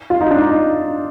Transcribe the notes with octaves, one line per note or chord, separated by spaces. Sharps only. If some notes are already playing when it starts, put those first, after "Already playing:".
F4
D#4
D4
D#4